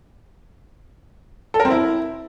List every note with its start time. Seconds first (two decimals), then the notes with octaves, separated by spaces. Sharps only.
1.54 A4
1.60 A#4
1.65 C4
1.70 E4